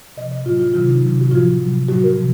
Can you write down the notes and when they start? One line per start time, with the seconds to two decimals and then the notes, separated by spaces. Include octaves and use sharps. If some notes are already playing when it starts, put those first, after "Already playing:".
0.17 C3 F3 D#5
0.32 D#5
0.45 A2 F#3 F4
0.59 F4
0.74 C3 D#3 F#3 F4
0.89 D#4
1.02 C3 D#3 F#3
1.21 F#4
1.31 A2 F3 F4
1.61 C3 F#3
1.88 A2 F#3 F#4
2.04 A#4
2.17 C3 F3